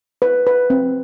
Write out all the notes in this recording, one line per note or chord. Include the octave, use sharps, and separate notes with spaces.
B4
B4
C4